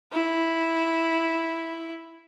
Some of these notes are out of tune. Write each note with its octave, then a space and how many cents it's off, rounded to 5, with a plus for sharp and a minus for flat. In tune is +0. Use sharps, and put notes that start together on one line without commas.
E4 -5